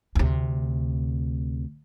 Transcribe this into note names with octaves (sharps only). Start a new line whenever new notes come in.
D2 C3